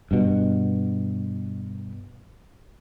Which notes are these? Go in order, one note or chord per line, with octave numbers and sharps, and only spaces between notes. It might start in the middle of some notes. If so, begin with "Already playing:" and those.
G2 B2